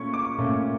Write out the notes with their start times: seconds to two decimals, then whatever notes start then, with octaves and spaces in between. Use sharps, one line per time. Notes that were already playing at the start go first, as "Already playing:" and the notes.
Already playing: A#2 A3 C#4 C#6
0.14 D6
0.38 A#2 A3 C#4